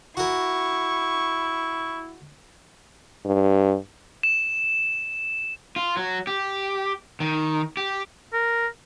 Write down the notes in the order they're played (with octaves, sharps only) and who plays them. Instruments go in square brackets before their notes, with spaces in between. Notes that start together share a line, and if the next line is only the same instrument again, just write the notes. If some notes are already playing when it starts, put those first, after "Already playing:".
[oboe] E4 [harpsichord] F#4 A#4 [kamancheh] C#6
[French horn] G2
[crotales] E7
[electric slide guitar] F4
F#3
G4
D#3
G4
[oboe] A#4